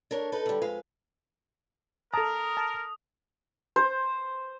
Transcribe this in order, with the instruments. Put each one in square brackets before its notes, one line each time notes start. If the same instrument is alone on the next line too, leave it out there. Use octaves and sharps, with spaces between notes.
[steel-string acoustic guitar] D4 A#4 C#5
D#4 A4 B4
D3 G3
F2 G#3 B4 F5
[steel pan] A4 A5 [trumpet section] A#4 [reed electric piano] A#5 [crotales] D#6
[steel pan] A5
[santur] C5